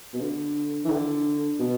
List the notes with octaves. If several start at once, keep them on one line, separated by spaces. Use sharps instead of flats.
B2
D3
E3
D3
B2